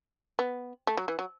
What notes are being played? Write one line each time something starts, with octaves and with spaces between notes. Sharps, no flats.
B3
A3
F#3
E3
F#3